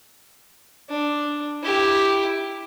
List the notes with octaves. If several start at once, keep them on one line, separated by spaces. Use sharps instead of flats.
D4
E4 G4